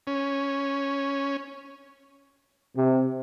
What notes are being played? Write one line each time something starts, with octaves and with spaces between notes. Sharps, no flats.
C#4
C3